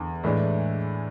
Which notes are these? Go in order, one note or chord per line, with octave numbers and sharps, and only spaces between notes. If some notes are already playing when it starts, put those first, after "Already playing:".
Already playing: E2 D3
A2 E3 G#3 D4